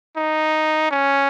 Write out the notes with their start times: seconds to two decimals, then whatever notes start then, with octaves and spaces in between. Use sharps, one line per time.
0.17 D#4
0.91 C#4